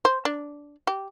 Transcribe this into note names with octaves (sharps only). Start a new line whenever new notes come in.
C5
D4
G4